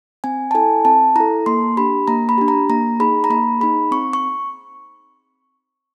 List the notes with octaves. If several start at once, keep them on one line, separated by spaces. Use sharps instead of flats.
C4 G#5
A5
E4 A4 G#5
C4 A5
E4 A4 A#5
A#3 C6
D4 G4 B5
A#3 A#5
B5
D4 G4
A#5
A#3 A#5
D#4 G#4 B5
A#5
A#3 B5
D#4 G#4 B5
C4 C#6
C#6